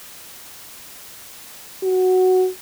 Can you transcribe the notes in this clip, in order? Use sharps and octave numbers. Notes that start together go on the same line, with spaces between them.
F#4